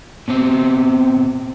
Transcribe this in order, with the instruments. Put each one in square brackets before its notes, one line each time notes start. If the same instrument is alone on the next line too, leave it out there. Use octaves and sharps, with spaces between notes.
[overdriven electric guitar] B2 C4